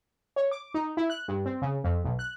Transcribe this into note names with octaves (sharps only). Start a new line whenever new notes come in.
C#5
D6
D#4
E4
F#6
G2
C4
C#3
F2
B1
F#6